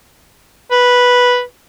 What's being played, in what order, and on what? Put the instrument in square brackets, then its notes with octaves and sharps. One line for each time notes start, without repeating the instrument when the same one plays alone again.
[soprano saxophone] B4